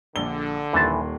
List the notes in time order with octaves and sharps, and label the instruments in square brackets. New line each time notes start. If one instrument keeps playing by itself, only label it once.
[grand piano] A#1 G7 [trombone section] D3
[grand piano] D#1 D#2 C6 [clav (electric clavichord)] E3 A5